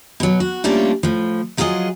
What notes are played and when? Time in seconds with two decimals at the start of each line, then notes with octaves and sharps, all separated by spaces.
0.20 B2 F#3
0.40 F#4
0.64 G3 A3 A#3 C#4 D4 F4
1.03 A2 F3
1.57 F3 F#3 F4 G4 G#4 D#5